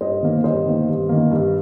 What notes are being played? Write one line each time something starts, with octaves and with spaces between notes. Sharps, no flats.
G2 C5 D#5
D#3 A#3
G2 C5 D#5
D#3 A#3
G2
D#3 A#3
G2